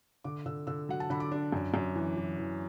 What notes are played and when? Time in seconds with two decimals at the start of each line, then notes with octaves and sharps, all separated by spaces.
0.24 D3 D6
0.46 D3 E6
0.67 D3 E6
0.89 F#3 F#5
1.00 A5
1.10 D3 B5
1.20 D6
1.32 D4
1.52 F#2
1.74 F#2
1.96 E3
2.17 E3
2.38 E3